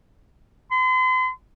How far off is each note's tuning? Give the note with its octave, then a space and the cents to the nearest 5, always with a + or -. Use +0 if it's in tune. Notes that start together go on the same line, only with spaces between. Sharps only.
C6 -40